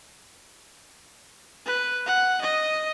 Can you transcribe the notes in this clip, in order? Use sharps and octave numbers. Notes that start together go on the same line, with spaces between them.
B4
F#5
D#5